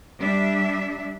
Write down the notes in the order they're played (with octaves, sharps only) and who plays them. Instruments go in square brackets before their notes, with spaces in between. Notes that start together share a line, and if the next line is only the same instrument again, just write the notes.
[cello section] G3 D4 E5